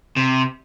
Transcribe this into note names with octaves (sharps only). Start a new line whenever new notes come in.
C3